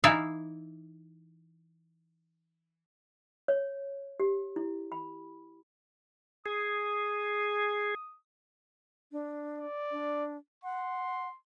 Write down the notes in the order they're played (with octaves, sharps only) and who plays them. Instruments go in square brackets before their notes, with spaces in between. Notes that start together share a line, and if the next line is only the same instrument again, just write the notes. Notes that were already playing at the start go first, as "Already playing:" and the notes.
[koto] E3 D#4 E4 D5 E5 F5
[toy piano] C#5
G4
E4
B5
[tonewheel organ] G#4 [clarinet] D#6
[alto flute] D4
[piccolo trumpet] D5
[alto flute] D4
[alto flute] F#5 [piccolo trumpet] C6